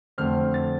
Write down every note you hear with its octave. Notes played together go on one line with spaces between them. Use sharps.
F2 D3 A3 C4 F6
A6